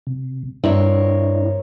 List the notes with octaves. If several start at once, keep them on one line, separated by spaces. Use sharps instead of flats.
C3
G2 C4 D4 E4 A#4 C#5